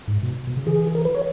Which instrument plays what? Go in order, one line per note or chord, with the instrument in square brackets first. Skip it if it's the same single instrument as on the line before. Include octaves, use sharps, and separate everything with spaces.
[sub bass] G#2
B2
B2
C#3
[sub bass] E3 [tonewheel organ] G#4
[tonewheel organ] A#4
B4
C#5